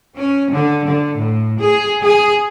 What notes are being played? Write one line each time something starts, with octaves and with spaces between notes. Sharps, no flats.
C#4
D3
D3
A2
G#4
G#4